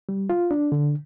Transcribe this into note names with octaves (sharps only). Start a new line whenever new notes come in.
G3
F4
D4
D3